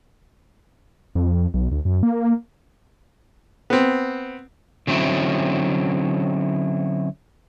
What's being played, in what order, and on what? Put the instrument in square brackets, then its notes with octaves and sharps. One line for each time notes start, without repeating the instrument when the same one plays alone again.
[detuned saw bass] F2
B1
D2
F#2
A#3
[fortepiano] B3 C4
[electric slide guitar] D3 F#3 C4 C#4 E4